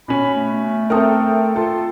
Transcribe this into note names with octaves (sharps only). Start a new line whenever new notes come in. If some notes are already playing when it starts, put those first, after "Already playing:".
B2 C#4 B5
A3
C4 A4 A#4 E5 G5 D#6
F4 A4